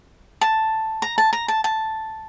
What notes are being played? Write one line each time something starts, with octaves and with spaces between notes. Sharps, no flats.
A5
A#5
A5
A#5
A5
A5